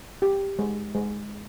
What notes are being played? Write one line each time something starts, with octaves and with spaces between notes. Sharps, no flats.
G4
G#3
G#3